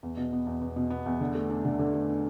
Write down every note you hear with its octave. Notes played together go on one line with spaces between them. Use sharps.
E2
B2
B3
E2
E2
B2
B3
E2
D3
A3
D4
D3
D3
A3
D4